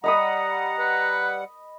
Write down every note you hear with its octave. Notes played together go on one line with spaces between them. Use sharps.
G3 D#5 F#5 A#5 B5 D#6
B4